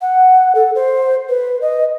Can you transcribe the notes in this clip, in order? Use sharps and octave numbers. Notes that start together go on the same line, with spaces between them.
F#5
A4
C5
B4
D#5